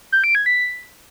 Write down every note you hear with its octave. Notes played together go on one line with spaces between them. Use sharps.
G6
D7
G#6
B6